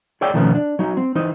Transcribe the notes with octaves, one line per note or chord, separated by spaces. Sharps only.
G#4 C#5 D5 E5 G5
B2 D#3 F3 A3 B3 C#4
D4
F#3 D#4
C4
E3 D#4 C5 D#5